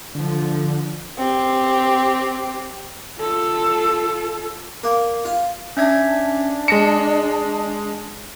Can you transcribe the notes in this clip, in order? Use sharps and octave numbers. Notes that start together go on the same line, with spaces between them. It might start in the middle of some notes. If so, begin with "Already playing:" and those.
D3 F3
C4 G4
F4 A4
A#3
F4
C#4 D4 E5 G#6
G#3 A5 A#6 C#7